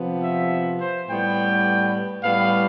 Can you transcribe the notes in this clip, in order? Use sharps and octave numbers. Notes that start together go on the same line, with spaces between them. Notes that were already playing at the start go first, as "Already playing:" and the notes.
Already playing: C3 F3 B3
E5
C5
A2 G3 B3 G5
A2 G3 B3 F5